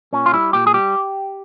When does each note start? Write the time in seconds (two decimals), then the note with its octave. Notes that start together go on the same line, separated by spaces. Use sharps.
0.13 A#2 C#4
0.26 F4
0.33 G3 E4
0.53 A#2 G4
0.67 G#4
0.74 G3 G4